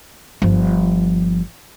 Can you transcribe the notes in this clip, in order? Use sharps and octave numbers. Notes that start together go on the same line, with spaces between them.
G1 F3